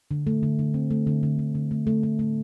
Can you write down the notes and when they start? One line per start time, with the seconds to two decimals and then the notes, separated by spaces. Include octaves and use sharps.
0.11 D3
0.27 A3
0.43 D3
0.59 D3
0.74 C4
0.91 A3
1.07 D3
1.23 D3
1.39 D3
1.55 D3
1.71 A3
1.87 A3
2.03 A3
2.19 A3